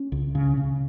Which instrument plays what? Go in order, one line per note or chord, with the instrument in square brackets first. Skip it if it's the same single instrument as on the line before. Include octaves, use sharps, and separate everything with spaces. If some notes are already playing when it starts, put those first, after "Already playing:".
Already playing: [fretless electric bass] C#4
C#2
C#3
C#3